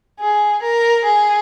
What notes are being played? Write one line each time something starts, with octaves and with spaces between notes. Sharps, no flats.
G#4
A#4
G#4